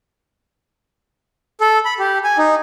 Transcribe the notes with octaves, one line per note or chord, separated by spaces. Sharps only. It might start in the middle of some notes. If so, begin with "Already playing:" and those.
A4
B5
G4
G#5
D#4